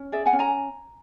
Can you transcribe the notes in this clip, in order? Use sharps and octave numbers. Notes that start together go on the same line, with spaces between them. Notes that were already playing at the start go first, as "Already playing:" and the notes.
Already playing: C#4
G#4 D5 E5
F#5 G#5
C#4
G#5 A#5